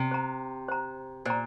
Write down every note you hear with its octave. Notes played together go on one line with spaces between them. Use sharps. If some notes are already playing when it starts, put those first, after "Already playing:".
Already playing: C3
C5 A#5
C5 A#5
A#2 C5 A#5